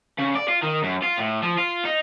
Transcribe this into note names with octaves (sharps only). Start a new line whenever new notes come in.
C#3
D5
F4
D#3
F#2
F4
A2
F3
F4
D#4